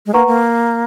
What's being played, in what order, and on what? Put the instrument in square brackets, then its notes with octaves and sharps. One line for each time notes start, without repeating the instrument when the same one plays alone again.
[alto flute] G#3
[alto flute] A#3 [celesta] B4 F#5 A#5 C#6
[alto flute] A#3